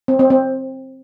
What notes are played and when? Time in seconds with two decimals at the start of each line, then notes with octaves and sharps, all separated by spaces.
0.08 C4
0.19 C4
0.30 C4